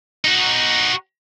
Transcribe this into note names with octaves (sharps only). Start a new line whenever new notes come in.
D#4 F#4